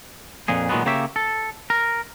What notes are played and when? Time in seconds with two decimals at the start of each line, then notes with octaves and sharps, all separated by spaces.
0.48 F2 A#2 G#4
0.69 A#2 D#3 F#3 G#3 B3
0.85 C#3 A#3 G4 C#5 E5
1.16 A4
1.70 A#4